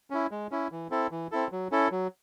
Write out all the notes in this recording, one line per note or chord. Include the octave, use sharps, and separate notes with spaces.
C#4 E4
G#3
C#4 E4
E3
C4 E4 A4
E3
C4 E4 A4
F#3
C#4 E4 A4
F#3